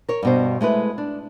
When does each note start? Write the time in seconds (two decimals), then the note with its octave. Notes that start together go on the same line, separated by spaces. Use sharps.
0.09 A#4 C#5
0.23 G2 B2 C5
0.61 G#3 A3 E4 B4
0.98 D4